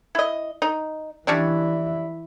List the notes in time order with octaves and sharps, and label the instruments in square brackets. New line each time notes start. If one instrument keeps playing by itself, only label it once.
[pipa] E4 D#5
D#4
[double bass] E3 E4 [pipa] G3 C#4 D4